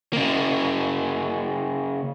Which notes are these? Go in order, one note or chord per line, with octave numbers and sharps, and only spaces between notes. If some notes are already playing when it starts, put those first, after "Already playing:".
C#3 A#3